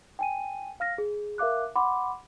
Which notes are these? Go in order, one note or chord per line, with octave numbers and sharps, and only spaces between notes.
G5 G#5 D#7
F5 F6 A#6
G#4
A#4 E5 F5 D6 F#6
F#5 B5 C6 D6